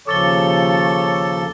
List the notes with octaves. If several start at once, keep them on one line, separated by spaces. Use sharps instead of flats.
D#2 C#3 F3 A4 C#5 D6 A6 G7